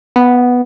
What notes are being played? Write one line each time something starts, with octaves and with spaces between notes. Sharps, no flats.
B3